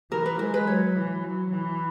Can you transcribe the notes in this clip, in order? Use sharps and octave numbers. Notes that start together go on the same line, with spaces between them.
E3 A#4
B4
G#3 A#4
B4
F#3 C#5
E3
F#3
E3